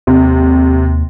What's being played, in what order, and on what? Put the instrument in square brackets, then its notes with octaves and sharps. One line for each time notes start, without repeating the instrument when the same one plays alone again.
[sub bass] D#2 [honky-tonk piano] C3